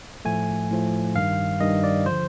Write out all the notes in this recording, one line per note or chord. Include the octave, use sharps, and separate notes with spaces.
A2 F3 A3 G#5
A2 F3 A3
G2 D#3 G3 F5
G2 D#3 G3 D#5
D5
D3 F3 C5